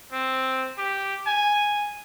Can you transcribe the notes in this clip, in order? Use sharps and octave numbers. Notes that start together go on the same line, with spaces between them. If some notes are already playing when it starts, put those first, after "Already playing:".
C4
G4
G#5